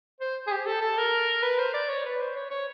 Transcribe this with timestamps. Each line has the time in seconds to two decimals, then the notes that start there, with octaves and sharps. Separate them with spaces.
0.20 C5
0.47 G#4
0.52 G4
0.66 A4
0.81 A4
0.98 A#4
1.43 B4
1.58 C5
1.74 D5
1.89 C#5
2.05 B4
2.21 C5
2.36 C#5
2.50 C#5